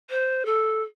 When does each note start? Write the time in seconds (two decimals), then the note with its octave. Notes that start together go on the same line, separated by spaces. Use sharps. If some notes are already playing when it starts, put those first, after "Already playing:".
0.10 C5
0.46 A4